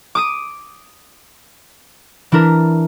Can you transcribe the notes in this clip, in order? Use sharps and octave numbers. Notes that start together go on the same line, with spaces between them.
D6 D#6 D#7
E3 D4 E4 A#4